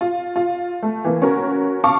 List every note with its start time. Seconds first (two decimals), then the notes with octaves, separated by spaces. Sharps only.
0.01 F4
0.36 F4
0.83 A3
1.04 E3 A#3
1.22 C#4 F#4 A#4
1.84 F5 A5 C#6 D6